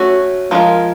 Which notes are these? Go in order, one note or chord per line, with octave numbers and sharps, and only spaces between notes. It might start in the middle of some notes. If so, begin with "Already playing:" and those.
Already playing: A3 C#4 F#4
F3 G#3 C#4 F4 A#4